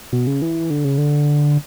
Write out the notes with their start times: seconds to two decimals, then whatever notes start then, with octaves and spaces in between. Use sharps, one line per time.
0.13 B2
0.27 C#3
0.42 E3
0.70 D3
0.84 C#3
0.98 D3